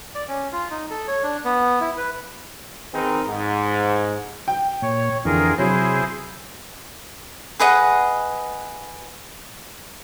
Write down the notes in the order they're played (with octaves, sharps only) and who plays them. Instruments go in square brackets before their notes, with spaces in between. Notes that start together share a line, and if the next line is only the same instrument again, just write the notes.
[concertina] D5
C#4
F4
D#4
A4
C#5
D4
B3
E4
B4
[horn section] D#3 C4 D#4 G#4 A#4 B4
G#2
[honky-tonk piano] G5
[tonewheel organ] A#2 [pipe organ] C#5
[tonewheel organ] F2 D3 E3 [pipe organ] F4 G#4 A#4
[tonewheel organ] C3 [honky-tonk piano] F#3 [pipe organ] E4 G#4 C5
[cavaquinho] G#4 B4 D#5 F#5